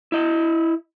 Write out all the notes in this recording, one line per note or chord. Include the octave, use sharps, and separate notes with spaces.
E4 D#5